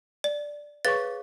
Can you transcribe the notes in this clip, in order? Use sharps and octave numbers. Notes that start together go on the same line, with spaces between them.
D5
G#4 B4 C#5 F5 C#6 A6